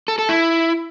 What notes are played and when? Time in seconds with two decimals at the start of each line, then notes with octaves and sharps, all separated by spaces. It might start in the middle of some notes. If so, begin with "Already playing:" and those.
0.08 A4
0.19 A4
0.29 E4